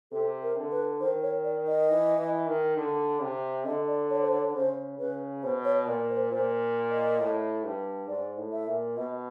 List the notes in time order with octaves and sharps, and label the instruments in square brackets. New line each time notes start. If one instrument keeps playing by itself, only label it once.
[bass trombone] C3 [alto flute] A4
[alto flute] A#4
[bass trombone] D3
[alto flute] B4
[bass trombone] D#3 [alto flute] C5
[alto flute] C#5
D5
D#5
[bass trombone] E3
E3
D#3
D3
C3
[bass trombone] D3 [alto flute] D#5
[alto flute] D5
C#5
C5
C#5
[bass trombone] C#3 [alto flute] C5
[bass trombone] C#3 [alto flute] B4
[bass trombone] B2 [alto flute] C5
[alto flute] C#5
[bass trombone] A#2 [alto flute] D5
[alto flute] C5
[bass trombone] A#2 [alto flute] C5
[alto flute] D#5
[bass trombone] A2
G2
[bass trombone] G#2 [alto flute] D5
[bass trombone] A2
[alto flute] E5
[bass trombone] A#2
[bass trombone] B2 [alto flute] D#5